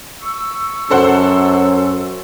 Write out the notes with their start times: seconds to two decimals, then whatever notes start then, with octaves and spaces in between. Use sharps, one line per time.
0.22 C#6 E6
0.90 F#2 A4 C5 F#5